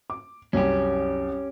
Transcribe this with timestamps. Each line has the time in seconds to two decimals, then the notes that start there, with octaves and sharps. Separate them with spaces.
0.10 D6
0.53 C2 F#2 C#4 G4